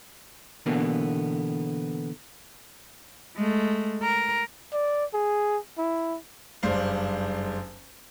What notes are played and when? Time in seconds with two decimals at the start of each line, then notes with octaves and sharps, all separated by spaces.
0.66 B2 D3 E3 A#3 B3
3.37 G#3 A3
4.03 A#4
4.73 D5
5.14 G#4
5.78 E4
6.63 F#1 G2 D4 C5 F5